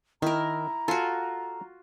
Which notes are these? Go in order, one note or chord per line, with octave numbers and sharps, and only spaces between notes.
D#3 E4 A#4 A#5
F4 F#4 A4 G#5 A5